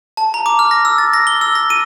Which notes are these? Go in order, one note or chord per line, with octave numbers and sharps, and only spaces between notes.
A5
A#5
D6
F6
A#6
E6
A6
A#6
G7
E6
A#6
D#7